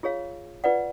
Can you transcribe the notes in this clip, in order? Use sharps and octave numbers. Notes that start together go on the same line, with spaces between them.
F4 G#4 C#5 F5
F4 B4 D5 F#5